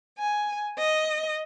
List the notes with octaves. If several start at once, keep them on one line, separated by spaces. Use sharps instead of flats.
G#5
D#5